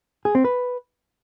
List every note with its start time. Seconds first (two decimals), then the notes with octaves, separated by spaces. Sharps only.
0.25 G#4
0.35 C4
0.44 B4